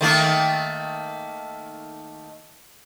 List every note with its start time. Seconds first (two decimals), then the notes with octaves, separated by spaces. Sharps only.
0.01 D#3 A3 A#3